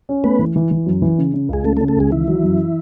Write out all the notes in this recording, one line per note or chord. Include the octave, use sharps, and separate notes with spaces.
C#4
A3 B3 B4
E3
E3
E3
F#2
E3
C#3
C#3
C#2 G#4
C#3 A3 A4
A3 A4
C#3
A3 A4
C#2 G#3 G#4
D#3 E3 E4
F#3
F#2